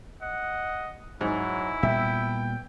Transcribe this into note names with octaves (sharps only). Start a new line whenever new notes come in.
D#5 F#5
G#2 F#3 E4
A#2 G3 B3 E5 G5